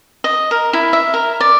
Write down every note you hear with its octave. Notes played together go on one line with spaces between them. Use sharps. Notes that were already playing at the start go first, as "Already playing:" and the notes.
D#5
A#4
E4
E5
A#4
D5